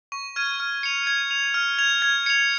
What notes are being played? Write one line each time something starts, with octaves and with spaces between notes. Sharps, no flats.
C#6
F6 G#6 D#7
F6
C#7 F7
G#6
F7
F6
G#6 F7
G#6
C#7 F7